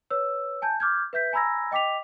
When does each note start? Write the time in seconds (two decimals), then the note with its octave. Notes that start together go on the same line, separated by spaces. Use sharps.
0.10 B4 C#5 E6
0.62 G#5 A5 G6
0.80 D6 F6 G6 G#6
1.13 B4 E5 G6 B6
1.33 G#5 A#5 B5 E6 G#6 A#6
1.71 D#5 G5 D6 B6 F7